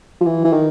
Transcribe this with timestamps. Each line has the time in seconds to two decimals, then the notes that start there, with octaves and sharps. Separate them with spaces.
0.21 F3
0.26 E3
0.44 E3
0.53 D#3